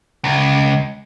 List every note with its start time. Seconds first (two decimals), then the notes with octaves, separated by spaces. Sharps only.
0.24 C#2